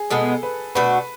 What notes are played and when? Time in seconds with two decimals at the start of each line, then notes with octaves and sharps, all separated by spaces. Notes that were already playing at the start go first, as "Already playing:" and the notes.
Already playing: G#4
0.10 B2 G#3 B3 A4
0.43 B4
0.75 B2 A3 D4 F#4 B4